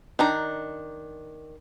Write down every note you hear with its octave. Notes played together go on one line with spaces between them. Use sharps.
D#3 D4 A#5